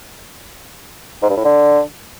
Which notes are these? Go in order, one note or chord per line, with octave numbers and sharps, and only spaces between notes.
G#2
G2
A2
D3